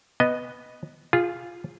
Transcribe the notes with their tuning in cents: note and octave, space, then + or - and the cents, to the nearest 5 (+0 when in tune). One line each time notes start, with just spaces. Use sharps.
B3 +0 D#5 +0
F4 +0 G#4 -20